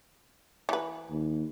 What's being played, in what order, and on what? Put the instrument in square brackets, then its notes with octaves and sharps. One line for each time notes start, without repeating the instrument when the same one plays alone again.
[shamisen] E3 B4
[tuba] D#2